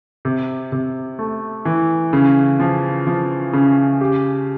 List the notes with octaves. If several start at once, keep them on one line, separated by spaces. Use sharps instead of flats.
C3
C3
A3
E3
C#3
F3
F3
C#3
G4